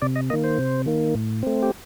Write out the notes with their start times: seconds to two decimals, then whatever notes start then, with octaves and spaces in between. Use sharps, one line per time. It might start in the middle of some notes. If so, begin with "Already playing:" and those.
0.02 C3 D5
0.16 D#5
0.30 D#3 A#3 D#5
0.44 C5
0.58 C3
0.86 D#3 A#3
1.15 A2
1.43 A3 C4
1.63 G4